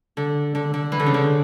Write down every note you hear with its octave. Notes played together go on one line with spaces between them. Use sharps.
D3
D3
D3
E3
D3
C#3
D3